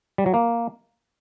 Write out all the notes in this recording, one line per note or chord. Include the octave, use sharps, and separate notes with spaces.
G3
F#3
A#3